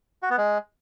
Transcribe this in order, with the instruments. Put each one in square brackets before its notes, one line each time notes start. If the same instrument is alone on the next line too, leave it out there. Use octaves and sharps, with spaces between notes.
[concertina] F#4
B3
G#3